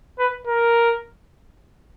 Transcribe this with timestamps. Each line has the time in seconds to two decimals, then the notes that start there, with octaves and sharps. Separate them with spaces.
0.19 B4
0.47 A#4